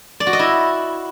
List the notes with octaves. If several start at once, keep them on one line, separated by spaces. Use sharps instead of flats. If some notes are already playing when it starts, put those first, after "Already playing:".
D5
F#4
D#5
E4